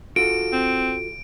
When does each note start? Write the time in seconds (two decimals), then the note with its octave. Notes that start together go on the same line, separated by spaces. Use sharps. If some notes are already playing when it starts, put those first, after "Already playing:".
0.16 F4 F#4 A4 D7
0.53 C4